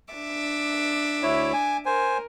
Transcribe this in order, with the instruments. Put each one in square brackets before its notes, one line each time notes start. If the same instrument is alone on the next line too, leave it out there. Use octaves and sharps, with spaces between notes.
[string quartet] D4 E5 D6
[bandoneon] D2 E4 C#5
G#5
[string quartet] A#4 [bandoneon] C5 G#5